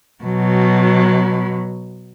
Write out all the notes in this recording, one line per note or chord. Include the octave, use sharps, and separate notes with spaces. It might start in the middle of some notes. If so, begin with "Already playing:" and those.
B2 F#3